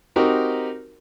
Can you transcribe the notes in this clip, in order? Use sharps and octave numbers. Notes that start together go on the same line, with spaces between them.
C4 D#4 F#4 G4 A#4